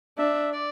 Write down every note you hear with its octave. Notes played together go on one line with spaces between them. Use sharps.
D4 E5
D5